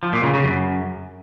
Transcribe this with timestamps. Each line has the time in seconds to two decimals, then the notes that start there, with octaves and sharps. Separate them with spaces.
0.03 F3
0.13 A#2
0.23 C#3
0.34 C#3
0.44 F#2